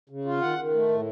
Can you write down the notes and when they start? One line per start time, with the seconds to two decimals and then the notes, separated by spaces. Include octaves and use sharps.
0.10 C#3
0.25 F4
0.41 D#3 F#5
0.57 D#3
0.73 A3
0.89 A2